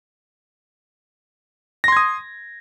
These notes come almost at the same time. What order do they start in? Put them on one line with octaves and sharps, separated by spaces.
A#6 C6 G#6 D#6